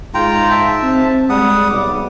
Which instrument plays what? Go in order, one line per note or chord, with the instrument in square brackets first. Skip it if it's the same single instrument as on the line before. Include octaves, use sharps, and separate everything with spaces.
[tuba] G#2 [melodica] F4 G5 A#5
[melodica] E5 A5
[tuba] C4
[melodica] G3 F#5 D#6 [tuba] G#3
[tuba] B1 [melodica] G3 D6